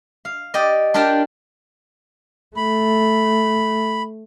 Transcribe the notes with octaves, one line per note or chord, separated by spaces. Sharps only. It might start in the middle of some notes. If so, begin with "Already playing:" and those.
F5
G4 D5 D#5
D4 F4 G4 A#4 G5 A5
A3 B5